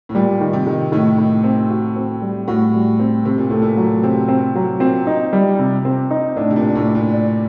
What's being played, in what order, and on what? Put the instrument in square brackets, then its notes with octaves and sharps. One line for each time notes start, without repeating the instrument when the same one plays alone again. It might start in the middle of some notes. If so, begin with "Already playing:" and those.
[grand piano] A2
[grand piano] A#2 [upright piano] G3
[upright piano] D#3
[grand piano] C3
[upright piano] D#3
[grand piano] A2 [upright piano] D#3
[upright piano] D#3
C4
F#4
C4
G3
[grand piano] A2 [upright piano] F#4
[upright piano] G3
C4
[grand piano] C3 [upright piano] C4
[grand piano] A#2
[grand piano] A2 [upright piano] A3
[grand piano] A#2
[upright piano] F#3
[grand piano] C3 [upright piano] C4
[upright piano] C4
F#3
[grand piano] A#2 [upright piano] C4
[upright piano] D#4
G3
C3
C4
D#4
[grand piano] A2 [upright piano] D4
[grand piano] C3
A#2
[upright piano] D4
[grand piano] A2
[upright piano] D5
[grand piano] A#2
[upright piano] D5